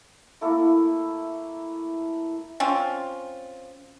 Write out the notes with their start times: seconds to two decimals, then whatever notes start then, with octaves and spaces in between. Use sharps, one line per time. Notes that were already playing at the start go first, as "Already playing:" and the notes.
0.41 A3 A#3 E4 A4
2.60 C4 C#4 F4